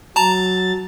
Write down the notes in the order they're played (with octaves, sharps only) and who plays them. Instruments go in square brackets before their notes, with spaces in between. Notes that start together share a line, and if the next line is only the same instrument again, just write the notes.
[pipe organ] F#3 A6 [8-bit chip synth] A5 A#5